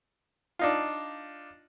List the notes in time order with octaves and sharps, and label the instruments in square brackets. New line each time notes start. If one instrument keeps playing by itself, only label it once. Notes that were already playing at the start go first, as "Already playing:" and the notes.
[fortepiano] D4 D#4 F4